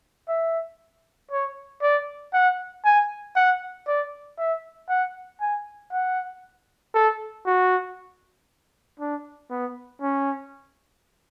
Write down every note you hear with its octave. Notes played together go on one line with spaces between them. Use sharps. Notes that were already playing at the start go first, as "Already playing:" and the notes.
E5
C#5
D5
F#5
G#5
F#5
D5
E5
F#5
G#5
F#5
A4
F#4
D4
B3
C#4